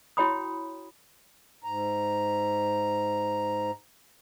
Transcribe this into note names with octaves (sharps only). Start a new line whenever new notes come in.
E4 F#4 C#5 G5 B5 D#6
G#2 A#5